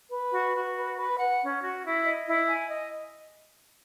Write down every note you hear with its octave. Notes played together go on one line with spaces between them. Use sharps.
B4
F#4
F#4
B4
B4
F#5
C#4
F#4
E4
D#5
E4
G#5
D#5